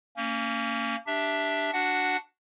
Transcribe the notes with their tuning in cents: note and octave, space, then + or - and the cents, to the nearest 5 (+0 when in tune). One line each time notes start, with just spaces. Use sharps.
A#3 -30 C#4 +0
D4 +0 G4 +0 E5 +0
D4 +0 F#4 +0 F#5 +0